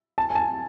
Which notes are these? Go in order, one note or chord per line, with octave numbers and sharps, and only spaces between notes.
A5
G#5
A5